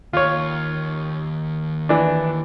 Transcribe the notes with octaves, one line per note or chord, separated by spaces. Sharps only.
D#2 F4 C#5
E3 D4